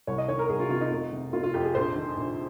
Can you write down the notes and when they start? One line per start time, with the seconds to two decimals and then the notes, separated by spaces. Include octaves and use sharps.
0.07 C2 C#5
0.18 D#5
0.28 D#3 C#5
0.39 A#4
0.50 C2 G#4
0.60 F4
0.70 C3 F4
0.81 D#4
0.91 F1
1.12 C3
1.33 F1 F4
1.44 F4
1.54 F2 G4
1.65 G#4
1.75 A#1 C5
1.96 D#3
2.17 A#1